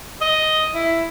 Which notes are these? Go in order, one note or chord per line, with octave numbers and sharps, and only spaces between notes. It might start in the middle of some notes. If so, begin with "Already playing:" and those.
D#5
E4